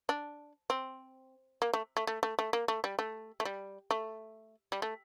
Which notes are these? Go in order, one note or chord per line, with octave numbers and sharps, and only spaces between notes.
D4
C4
A#3
A3
A3
A3
A3
A3
A#3
A3
G3
A3
A3
G3
A3
G3
A3